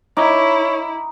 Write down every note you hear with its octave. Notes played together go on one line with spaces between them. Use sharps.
D#4 E4 C#5 D6